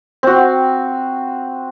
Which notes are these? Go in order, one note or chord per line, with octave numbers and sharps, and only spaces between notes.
C4 F#4